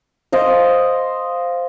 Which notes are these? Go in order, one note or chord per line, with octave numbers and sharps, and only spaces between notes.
C5 D#5 F5